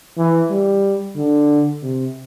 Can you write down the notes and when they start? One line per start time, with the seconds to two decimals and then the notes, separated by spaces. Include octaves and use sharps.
0.18 E3
0.50 G3
1.16 D3
1.83 C3